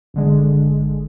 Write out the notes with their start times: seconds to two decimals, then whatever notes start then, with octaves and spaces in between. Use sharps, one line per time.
0.14 G1 D3 G#3